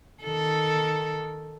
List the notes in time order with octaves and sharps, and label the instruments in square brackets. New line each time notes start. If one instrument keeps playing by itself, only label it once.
[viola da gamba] D#3 A4